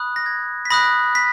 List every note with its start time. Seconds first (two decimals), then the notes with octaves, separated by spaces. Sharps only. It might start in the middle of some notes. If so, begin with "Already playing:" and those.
Already playing: B5 D#6 F#6
0.16 A#6
0.26 G#6
0.65 B6
0.70 B5 D#6 F#6 A#6
1.15 B6